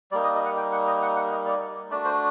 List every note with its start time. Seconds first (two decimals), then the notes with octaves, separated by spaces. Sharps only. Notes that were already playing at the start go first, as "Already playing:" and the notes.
0.12 G3 A#3 D#4 D5
0.24 D#5
0.35 D#5
0.45 F#5
0.57 G5
0.72 F#5
0.87 D#5
1.02 F#5
1.16 F#5
1.31 D#5
1.45 D5
1.90 A3 D4 F#4 D5
2.05 C5